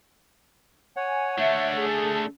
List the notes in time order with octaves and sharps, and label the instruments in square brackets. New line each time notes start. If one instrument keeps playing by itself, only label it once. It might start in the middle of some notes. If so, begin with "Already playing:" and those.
[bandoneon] C#5 F#5 [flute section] G#5
[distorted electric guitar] A3 D4 [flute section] E5
[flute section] G#4 A4